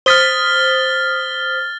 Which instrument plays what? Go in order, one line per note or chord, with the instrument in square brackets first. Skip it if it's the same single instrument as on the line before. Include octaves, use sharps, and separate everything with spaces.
[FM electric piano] C5 D#6 B6 [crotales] F6 A6 G7